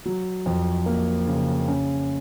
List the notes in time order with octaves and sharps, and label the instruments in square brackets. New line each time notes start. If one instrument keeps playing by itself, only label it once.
[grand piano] F#3
F2
A#3
C#3
C#4